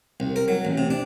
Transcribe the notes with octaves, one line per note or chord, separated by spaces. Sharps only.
C2
A#4
F#3
A1
C3
D4